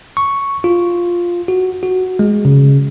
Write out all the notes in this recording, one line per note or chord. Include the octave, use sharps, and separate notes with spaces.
C#6
F4
F#4
F#4
G#3
C#3